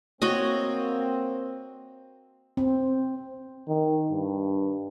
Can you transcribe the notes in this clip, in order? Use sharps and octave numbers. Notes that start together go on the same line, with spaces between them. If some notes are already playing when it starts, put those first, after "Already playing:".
A#3 C4 F#4 C#5 D#5
C4
D#3
G2